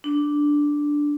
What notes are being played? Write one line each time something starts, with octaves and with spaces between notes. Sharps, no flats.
D4